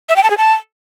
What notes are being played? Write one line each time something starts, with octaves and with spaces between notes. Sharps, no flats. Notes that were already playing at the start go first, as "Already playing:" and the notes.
E5
G5
A5
G#4
A5